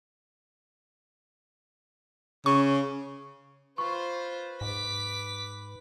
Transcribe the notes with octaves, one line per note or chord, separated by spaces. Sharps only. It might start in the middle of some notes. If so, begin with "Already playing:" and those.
C#3 C#6
F4 B4 C5 C#6
G#2 D6 B6